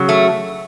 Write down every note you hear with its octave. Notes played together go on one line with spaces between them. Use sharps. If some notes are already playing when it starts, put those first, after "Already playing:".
Already playing: C#3 F#3
A3